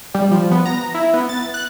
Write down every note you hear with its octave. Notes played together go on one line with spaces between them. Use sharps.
G3
F3
B3
A#5
E4
B3
A6
F#6